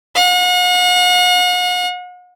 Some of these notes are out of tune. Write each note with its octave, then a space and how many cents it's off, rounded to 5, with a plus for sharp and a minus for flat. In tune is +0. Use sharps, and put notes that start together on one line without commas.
F#5 -45